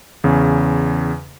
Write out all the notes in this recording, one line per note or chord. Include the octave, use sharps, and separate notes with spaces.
E2 C#3